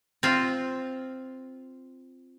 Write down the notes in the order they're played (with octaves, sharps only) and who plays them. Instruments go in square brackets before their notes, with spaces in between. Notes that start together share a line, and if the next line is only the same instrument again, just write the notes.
[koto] C4 F4